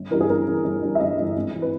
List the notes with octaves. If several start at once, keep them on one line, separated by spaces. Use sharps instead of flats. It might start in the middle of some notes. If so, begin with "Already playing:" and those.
Already playing: G1
G2 E3 A#4
G#4
G1 A#4
G2 E3
G1
G2 E3
E5
G1 D#5
G2 E3
G#1
E3
B4